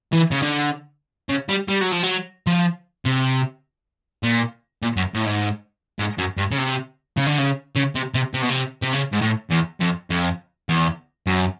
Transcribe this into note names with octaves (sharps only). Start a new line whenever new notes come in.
E3
C#3
D3
C#3
G3
G3
F#3
F3
F#3
F3
C3
A#2
A#2
F#2
A2
G#2
G#2
F#2
G2
C#3
C3
C#3
D3
C#3
C#3
C3
C3
C3
B2
C3
C3
C#3
G#2
A2
E2
F2
F2
E2
F#2